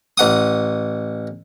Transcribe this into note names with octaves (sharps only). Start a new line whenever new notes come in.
A1 F#5 D#6